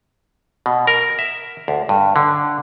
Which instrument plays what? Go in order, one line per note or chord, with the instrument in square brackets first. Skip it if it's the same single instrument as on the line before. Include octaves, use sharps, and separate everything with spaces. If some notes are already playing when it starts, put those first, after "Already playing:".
[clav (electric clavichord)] B2
A#4
E5
D2
G2
D3